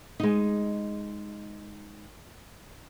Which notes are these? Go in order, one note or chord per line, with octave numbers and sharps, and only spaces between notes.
G#3 D#4